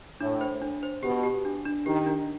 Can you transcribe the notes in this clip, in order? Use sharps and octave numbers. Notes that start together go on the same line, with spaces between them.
A2 D4
C5
D4
C5
B2 G4
G4
D4
D4
D#3 G4
D4